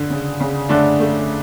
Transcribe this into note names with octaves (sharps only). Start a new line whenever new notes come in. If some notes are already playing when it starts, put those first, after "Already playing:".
Already playing: D3
C#3
C#3
D3 A3 D4
A3